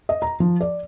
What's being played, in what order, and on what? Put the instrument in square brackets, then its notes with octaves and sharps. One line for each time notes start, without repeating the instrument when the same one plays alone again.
[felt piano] D#5
A#5
F3
D5